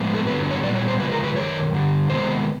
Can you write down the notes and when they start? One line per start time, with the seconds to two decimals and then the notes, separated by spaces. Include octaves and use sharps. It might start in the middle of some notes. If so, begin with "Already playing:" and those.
Already playing: A2 F3 G#3 B3
0.14 A4
0.27 G2 D3 F#3 B3 B4
0.51 C#5
0.63 A#2 G3 B3 D5
0.76 C#5
0.88 C5
1.00 C#3 F3 G#3 B4
1.12 A#4
1.24 B4
1.36 F#2 D#3 C#5
1.72 G2 D3 G3
2.09 C3 D#3 G#3 B3 C5